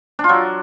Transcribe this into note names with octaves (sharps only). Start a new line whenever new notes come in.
D4
F4
F#3